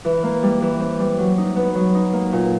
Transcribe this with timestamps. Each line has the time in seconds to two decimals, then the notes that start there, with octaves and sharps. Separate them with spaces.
0.05 E3
0.23 A#3
0.43 G3
0.62 E3
0.80 C4
1.00 G3
1.18 F#3
1.38 D#4
1.56 B3
1.75 F#3
1.95 D#4
2.13 A#3
2.33 A#2